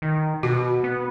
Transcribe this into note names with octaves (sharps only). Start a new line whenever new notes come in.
D#3
B2 F#4
B3